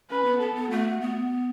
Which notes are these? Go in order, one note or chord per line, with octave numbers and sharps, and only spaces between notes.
C#4 B4
B3
B3 A4
B3
A3 F#4
B3